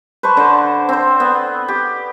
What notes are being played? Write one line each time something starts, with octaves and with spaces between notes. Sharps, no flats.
B4 C5 A5 C#6
D3 C5
C4 C5
B3
G4